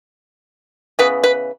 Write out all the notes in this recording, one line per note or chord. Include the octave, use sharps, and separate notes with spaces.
C#3 E3 B3 B4
B4